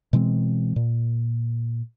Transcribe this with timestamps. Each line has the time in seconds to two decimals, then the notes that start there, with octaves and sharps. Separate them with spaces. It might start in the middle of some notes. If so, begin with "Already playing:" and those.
0.13 B2 E3 G#3 C4
0.76 A#2